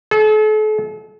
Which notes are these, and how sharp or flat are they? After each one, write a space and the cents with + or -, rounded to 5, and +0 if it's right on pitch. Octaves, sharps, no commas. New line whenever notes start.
A4 -40